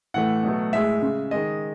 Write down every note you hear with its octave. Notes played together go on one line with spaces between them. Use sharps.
A2 E3 A3 F#5
B2 F#3 A3
A2 G#3 E5
C#3 G#3
D#3 G#3 D#5